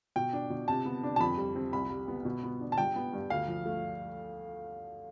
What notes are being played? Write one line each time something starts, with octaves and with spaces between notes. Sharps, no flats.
B2 G5
D4
B2
C3 A5
B3
D4
A5
F2 B5
G3
C4
C2 B5
G3
B3
B2
B3
D4
A5
G2 G5
B3
G2
D2 F5
F3
A3